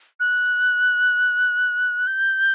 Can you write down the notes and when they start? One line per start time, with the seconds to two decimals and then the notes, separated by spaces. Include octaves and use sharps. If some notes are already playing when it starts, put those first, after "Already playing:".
0.20 F#6
2.07 G6